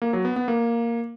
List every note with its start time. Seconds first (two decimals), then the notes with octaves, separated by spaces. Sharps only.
0.02 A#3
0.13 F#3
0.25 B3
0.36 B3
0.48 A#3